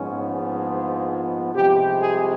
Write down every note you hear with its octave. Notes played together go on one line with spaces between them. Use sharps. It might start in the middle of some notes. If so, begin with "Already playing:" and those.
Already playing: A#1 G#2 F3 G#3 B3 C#4
C2 C3 F3 G#3 G4
G#4